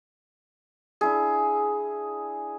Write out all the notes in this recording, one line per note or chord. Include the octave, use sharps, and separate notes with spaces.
D4 E4 G#4